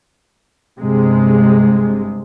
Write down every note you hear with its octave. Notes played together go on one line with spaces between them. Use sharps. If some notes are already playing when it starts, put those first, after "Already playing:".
G1 G2 C3 G#3